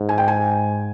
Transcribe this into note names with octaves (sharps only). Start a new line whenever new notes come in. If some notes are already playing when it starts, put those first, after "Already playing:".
Already playing: G#2
G#5
G5
G#5